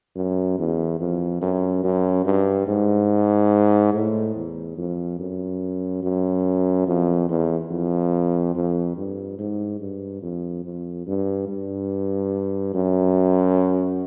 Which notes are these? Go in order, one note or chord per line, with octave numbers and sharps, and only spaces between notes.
F#2
E2
F2
F#2
F#2
G2
G#2
A2
E2
F2
F#2
F#2
F2
E2
F2
F2
G2
G#2
G2
F2
F2
G2
G2
F#2